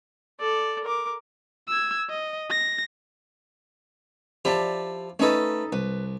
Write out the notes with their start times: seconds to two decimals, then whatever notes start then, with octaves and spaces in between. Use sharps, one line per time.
0.40 A4 D5
0.84 A#4 D6
1.68 E6 G#6
2.10 D#5
2.50 A#6
4.45 F3 E4 G4 D5 A5
5.19 A3 C#4 D#4 A4 B4
5.73 C2 B4